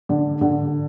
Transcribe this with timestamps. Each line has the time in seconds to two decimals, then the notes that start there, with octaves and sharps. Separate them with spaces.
0.09 D3
0.41 D3